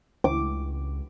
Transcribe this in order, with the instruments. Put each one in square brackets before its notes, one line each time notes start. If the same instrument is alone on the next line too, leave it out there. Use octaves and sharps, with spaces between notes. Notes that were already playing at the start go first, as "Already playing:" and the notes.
[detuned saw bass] C#2 [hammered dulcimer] D6